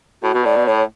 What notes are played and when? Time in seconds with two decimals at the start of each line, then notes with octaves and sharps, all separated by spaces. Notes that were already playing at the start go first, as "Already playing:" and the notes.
0.22 A2 F#4
0.34 B2
0.44 A2 D5
0.56 B2
0.66 A2 C#5